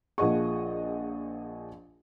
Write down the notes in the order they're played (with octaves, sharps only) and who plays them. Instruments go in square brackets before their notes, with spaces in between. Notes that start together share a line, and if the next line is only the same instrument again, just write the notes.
[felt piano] A#1 F3 G#4 D#5 F#5 C#6